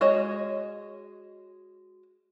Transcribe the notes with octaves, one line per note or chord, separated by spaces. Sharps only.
G#3 F#4 G#4 C#5 D#5